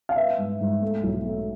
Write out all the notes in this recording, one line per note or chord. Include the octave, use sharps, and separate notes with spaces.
F5
B3 E5
G#2
G#2
A3
B1
A3